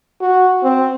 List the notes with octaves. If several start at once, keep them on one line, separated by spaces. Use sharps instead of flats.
F#4
C4